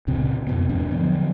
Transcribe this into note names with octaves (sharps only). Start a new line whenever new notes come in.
C#2 A#2 C#3 C4
F2 B2 B3
E2 G#2 C4 D4
D3 F3 F#3 B3